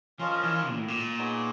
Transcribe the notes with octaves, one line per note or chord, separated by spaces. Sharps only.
F3 C#4 F4 A#4 D#5
E3
A#2
A2
A#2
B3 D#4 G#4 C#5